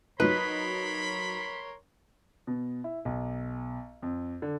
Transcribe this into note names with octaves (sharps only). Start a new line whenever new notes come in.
F#3 D#4 A#4 B4 C#5 B5 C6
B2
E4
B1
F2
D3